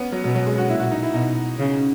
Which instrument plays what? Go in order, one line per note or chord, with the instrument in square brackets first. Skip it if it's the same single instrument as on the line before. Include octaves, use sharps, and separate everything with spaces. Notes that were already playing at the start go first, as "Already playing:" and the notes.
Already playing: [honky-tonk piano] B3 C#4
F#3
[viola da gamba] B2 [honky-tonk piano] F#3
[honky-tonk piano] F#3
G#3
F#4
[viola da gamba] A#2 [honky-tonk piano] E4
[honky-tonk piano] F#4
D#4
E4
[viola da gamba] B2 [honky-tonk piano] D#4
[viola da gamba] C#3